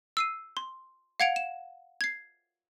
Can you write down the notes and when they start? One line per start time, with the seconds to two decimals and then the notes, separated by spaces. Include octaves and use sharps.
0.17 E6 C7 D#7
0.57 C6
1.20 F5 F#5 G#6 C#7 D7 F7
1.36 E7
2.01 G#6 C7